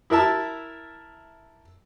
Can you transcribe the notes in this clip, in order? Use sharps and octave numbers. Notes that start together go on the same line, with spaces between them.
E4 A#4 E5 A5